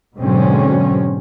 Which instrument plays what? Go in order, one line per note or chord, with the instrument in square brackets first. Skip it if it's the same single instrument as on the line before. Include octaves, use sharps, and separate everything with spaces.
[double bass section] G#2 B2 D3 F#3 C4 C#4